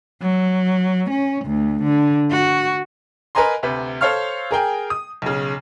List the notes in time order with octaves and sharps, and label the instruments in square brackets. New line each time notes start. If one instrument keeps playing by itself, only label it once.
[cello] F#3
C#4
D2
D3
F#4
[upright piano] A#4 B4 D#5 G#5 A#5 C6
D2 C3 B4
A4 C5 C#5 F5 C#6 F6
G#4 A#4 G5 G#5
D#6
B1 C#3